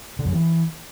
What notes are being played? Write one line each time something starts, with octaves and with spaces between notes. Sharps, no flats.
D3
F#2
E3